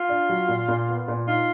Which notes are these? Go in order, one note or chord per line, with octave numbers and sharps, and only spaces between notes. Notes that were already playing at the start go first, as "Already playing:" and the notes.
Already playing: F4
D4
F#3
A#2
A#2
B3
A#2
D#4 F4